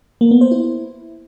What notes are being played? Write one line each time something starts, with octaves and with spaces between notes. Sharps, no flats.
A#3
B3
C5
E4